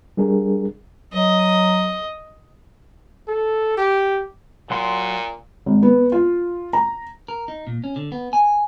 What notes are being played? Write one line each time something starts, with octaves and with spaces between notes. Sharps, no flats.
G3 D4 G#4 A#4
F#3 D#5
A4
G4
A#2 F#3 F#5 C6
G#1
B3
F4
A#5
A#4
D#4
A#2
C#4
D3
B3
G#5